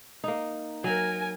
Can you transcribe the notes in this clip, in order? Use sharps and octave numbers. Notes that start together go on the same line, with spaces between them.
A#3 D#4
F#3 A#4 G#5